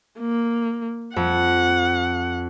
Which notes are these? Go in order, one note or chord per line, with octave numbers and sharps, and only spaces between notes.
A#3
F2 F#5